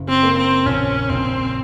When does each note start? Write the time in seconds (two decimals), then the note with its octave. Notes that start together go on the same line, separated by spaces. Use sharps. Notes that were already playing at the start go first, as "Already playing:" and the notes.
Already playing: F#1
0.09 C4
0.23 A#3
0.38 C4
0.66 A#1 C#4
1.09 A#1 C4